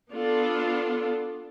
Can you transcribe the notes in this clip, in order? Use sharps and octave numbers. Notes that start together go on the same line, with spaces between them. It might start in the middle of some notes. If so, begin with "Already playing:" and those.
B3 D4 F4 A4